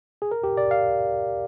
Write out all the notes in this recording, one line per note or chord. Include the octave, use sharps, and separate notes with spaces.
G#4
A#4
G4
D5
F5